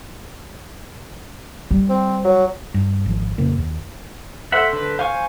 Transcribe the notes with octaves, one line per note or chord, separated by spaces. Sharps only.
G3
C4
F#3
G2
G#1 F3
F2 A#2 C#3 A#3
D#2
A4 C5 E5 F#5 E6
D3 B4
C5 F5 G#5 C#6